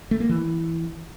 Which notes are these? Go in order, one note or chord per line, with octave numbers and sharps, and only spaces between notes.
A3
A#3
E3